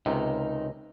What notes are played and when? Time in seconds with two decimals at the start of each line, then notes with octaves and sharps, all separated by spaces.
0.06 C#2 C3 D#4 A#4